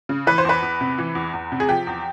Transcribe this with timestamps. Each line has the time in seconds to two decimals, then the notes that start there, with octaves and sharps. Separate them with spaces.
0.09 C#3
0.27 E3 B4
0.38 C5
0.45 E2 B4
0.62 E2
0.81 C3
0.98 E3
1.15 E2
1.33 E2
1.52 C3
1.60 G#4
1.69 F3 G4
1.87 E2